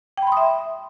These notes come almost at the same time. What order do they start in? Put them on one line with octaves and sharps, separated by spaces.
G5 B5 C6 D#6 E5